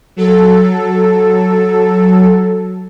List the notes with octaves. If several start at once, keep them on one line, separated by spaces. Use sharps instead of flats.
F#3 A4